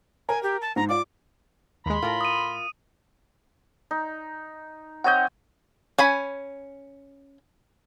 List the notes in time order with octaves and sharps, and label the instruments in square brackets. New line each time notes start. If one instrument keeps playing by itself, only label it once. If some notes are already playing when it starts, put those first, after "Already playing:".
[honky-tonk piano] A#4 [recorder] G#5
[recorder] G4
A5
[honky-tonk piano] G#2 [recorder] A#5
[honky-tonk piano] F4 D5 [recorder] D6
[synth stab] D#2 G#3 [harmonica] B5 C6
[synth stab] A2 [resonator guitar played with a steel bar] F4 A#4
[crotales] D#6 D#7
[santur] D#4
[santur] C4 C#5 D#5 [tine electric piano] F#5 G6
[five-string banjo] C#4 G#5 B5